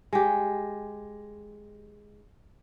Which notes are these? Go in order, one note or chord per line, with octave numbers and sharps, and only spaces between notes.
G#3 G4